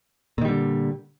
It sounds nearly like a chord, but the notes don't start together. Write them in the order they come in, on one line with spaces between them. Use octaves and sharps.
A#2 D#3 G3 D3